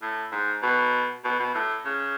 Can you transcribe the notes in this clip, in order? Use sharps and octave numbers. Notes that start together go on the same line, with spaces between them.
A2
G#2
B2
B2
B2
A2
C#3